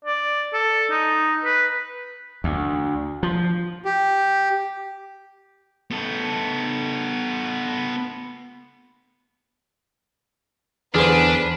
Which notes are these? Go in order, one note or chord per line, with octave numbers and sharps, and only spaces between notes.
D5
A4
D#4
B4
D2
F3
G4
B3 A4
E2 D3 D4 G#4 B4 C5 F6